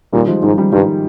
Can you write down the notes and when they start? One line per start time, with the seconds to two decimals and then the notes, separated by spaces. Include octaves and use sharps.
0.13 A#2 D#3 G3
0.28 F3 G#3
0.42 G#2 D#3 G3
0.57 D#3 G3
0.72 G2 D#3 G3